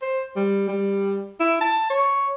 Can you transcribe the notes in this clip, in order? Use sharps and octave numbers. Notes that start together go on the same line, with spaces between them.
C5
G3
G3
E4
A5
C#5